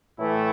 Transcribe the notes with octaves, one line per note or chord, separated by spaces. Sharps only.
A2 E3 A3 E4